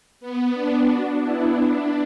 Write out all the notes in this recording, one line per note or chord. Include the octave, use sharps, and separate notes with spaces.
B3
D4
D4 F#4
B3 E4
D4